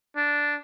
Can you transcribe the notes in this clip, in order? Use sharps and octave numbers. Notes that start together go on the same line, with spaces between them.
D4